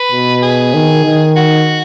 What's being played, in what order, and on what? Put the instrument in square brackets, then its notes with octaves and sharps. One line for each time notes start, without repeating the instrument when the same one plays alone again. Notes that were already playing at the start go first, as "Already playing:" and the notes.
Already playing: [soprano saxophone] B4
[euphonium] B2
[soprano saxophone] G#4
[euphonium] D#3
D#3
[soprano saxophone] F#4